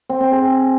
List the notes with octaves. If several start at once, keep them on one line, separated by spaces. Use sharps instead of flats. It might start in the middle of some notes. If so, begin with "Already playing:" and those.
C4
C4
G#4